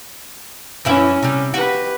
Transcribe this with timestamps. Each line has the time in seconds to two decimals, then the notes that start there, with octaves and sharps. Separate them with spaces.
0.85 F#2 E3 C#4 E4
1.23 C3 G3
1.54 F#4 G4 B4